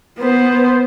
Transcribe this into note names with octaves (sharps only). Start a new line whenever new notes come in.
B3 C5